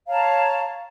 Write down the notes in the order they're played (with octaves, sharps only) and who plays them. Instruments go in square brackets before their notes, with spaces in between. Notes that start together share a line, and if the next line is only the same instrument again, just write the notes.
[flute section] C#5 F5 A5 A#5